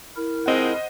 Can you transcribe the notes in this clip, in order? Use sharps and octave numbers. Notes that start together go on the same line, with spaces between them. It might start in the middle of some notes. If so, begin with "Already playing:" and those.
E4 A#4
F3 G#3 C4 C5 D#5 F#5